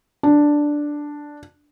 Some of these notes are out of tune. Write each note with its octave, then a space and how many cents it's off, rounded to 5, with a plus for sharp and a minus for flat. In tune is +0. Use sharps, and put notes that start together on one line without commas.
D4 +0